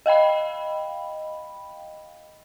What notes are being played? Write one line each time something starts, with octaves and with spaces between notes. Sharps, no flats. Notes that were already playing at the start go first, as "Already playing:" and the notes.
D#5 F5 G5 B5